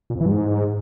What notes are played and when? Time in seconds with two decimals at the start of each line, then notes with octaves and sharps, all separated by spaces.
0.10 A#2
0.15 F2
0.21 E3
0.26 G2
0.31 G#2